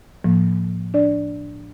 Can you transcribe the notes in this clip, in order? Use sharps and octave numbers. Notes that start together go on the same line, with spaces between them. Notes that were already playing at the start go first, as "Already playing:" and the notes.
A2 F3 A#3
D4 D5